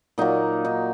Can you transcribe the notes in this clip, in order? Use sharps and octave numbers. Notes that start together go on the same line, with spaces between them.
A#2 F#3 A#3 D#4
D#4